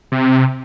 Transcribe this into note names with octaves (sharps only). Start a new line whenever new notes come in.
C3